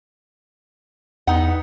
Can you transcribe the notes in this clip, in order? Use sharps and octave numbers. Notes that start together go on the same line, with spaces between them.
E2 B3 D#4 F#5